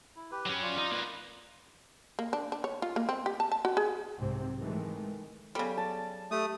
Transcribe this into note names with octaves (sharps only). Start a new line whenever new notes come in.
E4
G4 B4
F#3 C#4
F4 D5
D#4
A#3 B4
A#3
D4
D4
C#5
F4
A#3
C4
G4
A5
A5
F#4
G#4
C2 G#2 C3 F#3 C4
D#3 E3 G#3 A3
C#3 F#3 G3 B3 A4
A5
A3 G4 D#6